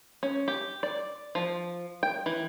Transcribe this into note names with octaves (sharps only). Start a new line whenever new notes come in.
C#4
G4
D5
F3
G5
E3